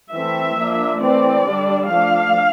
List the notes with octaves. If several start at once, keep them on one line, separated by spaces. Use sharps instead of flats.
E3 A3 C4 E5
F3 A#3 D4
E3 A3 C4 D5
D3 G3 D4
F3 A3 D4 F5